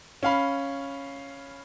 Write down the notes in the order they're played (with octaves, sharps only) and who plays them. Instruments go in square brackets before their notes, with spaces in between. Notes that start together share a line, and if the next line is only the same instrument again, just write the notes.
[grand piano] C#4 F5 B5